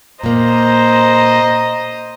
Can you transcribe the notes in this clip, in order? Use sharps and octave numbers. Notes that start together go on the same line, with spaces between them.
A#2 A#3 C5 D#5 A#5